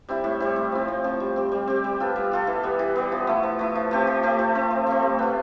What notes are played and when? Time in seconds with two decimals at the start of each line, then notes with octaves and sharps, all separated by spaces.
0.09 G3 C4 E4
0.24 A2
0.40 G3 C4 E4
0.56 A2
0.72 F3 C4
0.88 A2
1.04 F3 C4
1.20 G3
1.36 C4 G4
1.52 G3
1.68 C4 G4
1.84 G3
2.00 B3 F4 A4
2.16 G3
2.32 B3 F4 A4
2.47 E3
2.63 G3 B3
2.79 E3
2.96 G3 B3
3.12 F3
3.27 A3 E4
3.43 F3
3.59 A3 E4
3.75 F3
3.91 A3 C4 G4
4.07 F3
4.23 A3 C4 G4
4.39 F3
4.55 A3 C4
4.71 F3
4.87 A3 C4
5.03 G3
5.19 B3 F4